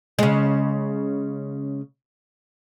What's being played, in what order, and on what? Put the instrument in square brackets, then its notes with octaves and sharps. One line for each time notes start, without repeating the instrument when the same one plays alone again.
[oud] C#3 G#3